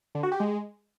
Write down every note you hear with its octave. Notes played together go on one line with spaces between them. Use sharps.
D3
F#4
G4
G#3